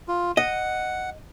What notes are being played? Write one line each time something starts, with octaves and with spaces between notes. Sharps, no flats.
F4
D#5 F#5